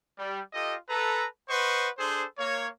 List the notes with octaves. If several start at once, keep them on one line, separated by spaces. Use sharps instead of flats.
G3
F4 G4 A4 D#5
A4 B4 A#5
B4 C5 D#5 F#5 C6 C#6
D4 G#4 A4 C5
A#3 C#5